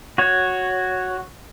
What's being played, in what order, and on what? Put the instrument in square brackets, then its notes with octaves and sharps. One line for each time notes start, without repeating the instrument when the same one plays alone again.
[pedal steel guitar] F#4 C#5